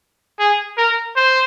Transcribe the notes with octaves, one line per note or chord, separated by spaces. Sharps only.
G#4
A#4
C5